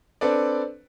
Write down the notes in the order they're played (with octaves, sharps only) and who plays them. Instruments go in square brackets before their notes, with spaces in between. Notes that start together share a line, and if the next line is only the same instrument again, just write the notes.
[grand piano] C4 D4 A4 B4 D5